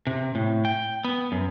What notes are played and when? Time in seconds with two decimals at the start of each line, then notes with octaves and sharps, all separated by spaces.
0.07 C3
0.35 A2
0.65 G5
1.04 B3
1.32 F#2